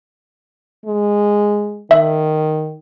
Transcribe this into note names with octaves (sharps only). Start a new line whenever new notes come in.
G#3
D#3 E5